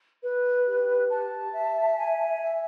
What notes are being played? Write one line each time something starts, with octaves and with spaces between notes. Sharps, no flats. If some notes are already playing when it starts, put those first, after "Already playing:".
B4
G4
A5
E5
G#5
E5